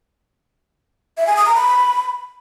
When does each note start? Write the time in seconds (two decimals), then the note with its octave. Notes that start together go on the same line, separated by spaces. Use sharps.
1.18 E5
1.27 G#5
1.37 D#6
1.46 A#5
1.56 B5